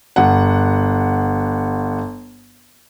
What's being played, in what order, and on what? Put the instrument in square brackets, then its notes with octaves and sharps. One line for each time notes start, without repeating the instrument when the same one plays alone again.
[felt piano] G1 F#5